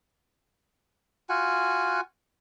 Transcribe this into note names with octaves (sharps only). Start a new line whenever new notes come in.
F4 F#4 F#5 G#5